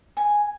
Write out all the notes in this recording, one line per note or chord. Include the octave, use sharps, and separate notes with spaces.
G#5